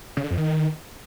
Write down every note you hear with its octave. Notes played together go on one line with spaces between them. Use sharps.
C#3
D3
F2
D#3